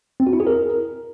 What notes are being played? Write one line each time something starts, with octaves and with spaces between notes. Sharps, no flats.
C4
F#4
E4
G#4
A#4